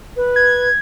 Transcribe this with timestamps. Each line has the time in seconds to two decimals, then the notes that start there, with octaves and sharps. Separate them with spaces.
0.16 B4
0.36 G#6